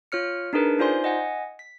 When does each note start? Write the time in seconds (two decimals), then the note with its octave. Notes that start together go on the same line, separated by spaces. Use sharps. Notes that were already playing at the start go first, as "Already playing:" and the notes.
0.12 F4 C#5 F6 C#7
0.53 D4 D#4 G#4 A#4 B4
0.79 D#4 F4 C5 D5 G#5 C6
1.04 D#5 F#5 G#5
1.59 B6